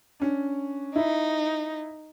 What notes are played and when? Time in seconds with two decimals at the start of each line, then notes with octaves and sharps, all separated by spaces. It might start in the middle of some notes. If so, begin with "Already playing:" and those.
0.20 C#4 D4
0.96 D#4 E4